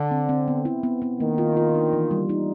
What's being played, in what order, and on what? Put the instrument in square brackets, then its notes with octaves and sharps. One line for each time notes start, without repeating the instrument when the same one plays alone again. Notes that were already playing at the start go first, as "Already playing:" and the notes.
Already playing: [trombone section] D3
[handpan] C4
C4
B3
E4
B3
B3
[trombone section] D#3 [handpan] A#3
[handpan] F4
F4
D4
E3
G3
D#4